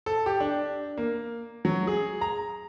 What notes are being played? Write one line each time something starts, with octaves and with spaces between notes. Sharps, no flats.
A4
G4
D4
A#3
F#3
G#4
A#5